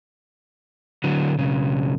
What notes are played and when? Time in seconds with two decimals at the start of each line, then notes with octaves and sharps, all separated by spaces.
1.04 D3 F#3
1.39 B1 C#3